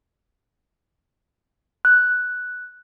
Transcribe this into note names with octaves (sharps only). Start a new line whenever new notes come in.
F#6